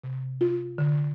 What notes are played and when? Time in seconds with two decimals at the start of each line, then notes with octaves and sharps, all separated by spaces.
0.04 C3
0.41 F4
0.78 D3